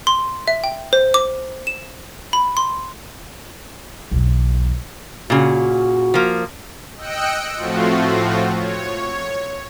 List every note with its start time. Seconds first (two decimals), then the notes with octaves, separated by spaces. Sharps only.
0.07 C6
0.48 E5
0.64 G5
0.93 C5
1.14 D6
1.67 E7
2.33 B5
2.57 C6
4.11 B1 E2
5.30 A#2 C#3 F#4
6.14 F3 A#3
6.97 D#5 G5 E6 F#6 C#7 D7
7.57 A2 F3 A3 C4 F4 F#4
8.55 C#5